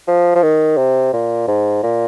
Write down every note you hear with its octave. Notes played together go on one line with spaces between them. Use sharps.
F3
F3
D#3
C3
A#2
G#2
A#2